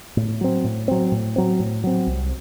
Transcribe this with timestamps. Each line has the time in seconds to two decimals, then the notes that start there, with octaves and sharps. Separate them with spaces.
0.17 A2
0.41 F#3 C4
0.64 A2
0.88 F#3 C4
1.12 A2
1.36 F#3 C4
1.60 A2
1.84 F#3 C4
2.07 C2